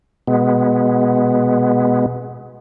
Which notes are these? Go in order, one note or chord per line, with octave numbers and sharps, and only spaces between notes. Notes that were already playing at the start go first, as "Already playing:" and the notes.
B2 G#3 B3